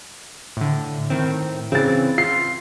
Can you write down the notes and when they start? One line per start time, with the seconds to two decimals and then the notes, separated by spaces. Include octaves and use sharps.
0.57 A2 D3
1.10 A2 D#3 C4
1.72 C#3 E3 C4 A6
2.18 F4 C7